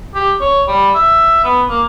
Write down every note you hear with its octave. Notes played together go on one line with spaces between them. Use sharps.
G4
C#5
G3
E5
B3
A#3